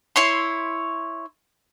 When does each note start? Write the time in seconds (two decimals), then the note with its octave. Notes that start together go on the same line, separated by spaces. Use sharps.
0.16 E4 C#5 C6